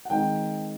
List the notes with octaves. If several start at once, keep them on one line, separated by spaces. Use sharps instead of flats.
F#5
D#3 G#3 C4 D#4 G5